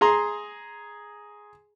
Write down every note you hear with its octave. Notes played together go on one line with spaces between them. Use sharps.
G#4 A#5 C6